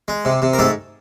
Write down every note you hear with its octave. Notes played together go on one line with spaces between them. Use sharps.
G#3
C3
C3
A#4
G#2 A3 A4